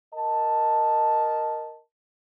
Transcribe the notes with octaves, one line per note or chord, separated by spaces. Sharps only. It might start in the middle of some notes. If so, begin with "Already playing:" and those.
A#4 D#5 A5